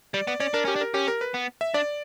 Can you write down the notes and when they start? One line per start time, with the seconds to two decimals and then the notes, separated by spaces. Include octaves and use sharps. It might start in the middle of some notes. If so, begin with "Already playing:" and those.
0.14 G3 D5
0.27 B3 D5
0.40 C#4 D5
0.54 D4 A#4
0.65 C#4 G4
0.76 D4
0.81 A#4
0.94 C#4 G4
1.08 A#4
1.21 B4
1.34 B3
1.61 E5
1.74 D4 D5